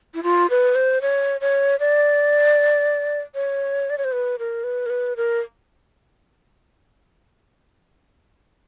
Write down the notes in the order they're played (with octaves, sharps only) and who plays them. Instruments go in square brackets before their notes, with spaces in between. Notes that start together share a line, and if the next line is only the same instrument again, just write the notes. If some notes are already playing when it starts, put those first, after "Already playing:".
[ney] E4
F4
B4
C5
C#5
C#5
D5
C#5
D5
C#5
C5
B4
A#4
B4
A#4
B4
A#4